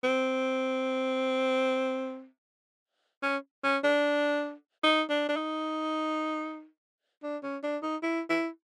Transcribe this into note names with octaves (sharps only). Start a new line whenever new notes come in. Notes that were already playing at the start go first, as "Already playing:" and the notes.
C4
C#4
C#4
D4
D#4
D4
D4
D#4
D4
C#4
D4
D#4
E4
E4